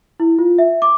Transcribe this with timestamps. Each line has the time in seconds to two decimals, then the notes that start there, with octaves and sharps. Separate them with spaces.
0.20 E4
0.39 F4
0.58 E5
0.82 D6